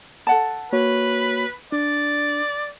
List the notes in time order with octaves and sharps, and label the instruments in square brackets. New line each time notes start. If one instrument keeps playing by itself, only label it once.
[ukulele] A4 F#5 A5
[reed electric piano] A#3 F#4 C#5 [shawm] B4
[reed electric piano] D4 [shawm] D5